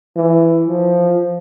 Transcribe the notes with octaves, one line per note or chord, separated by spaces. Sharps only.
E3
F3